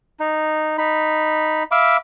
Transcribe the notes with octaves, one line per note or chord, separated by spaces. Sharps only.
D#4
D#4 B5
E5 F5 B5 D6